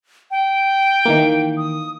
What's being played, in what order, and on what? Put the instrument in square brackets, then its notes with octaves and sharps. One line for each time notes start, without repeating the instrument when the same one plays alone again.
[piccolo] G5
[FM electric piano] D#3 E3 A#3
[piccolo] D#6